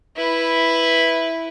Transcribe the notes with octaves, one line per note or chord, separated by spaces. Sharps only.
E4 B4